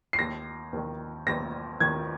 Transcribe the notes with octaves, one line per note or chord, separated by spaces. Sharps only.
C7
D#2 D#3 A#6
D#2 D#3
D#2 D#3 A#6
D#2 D#3 G#6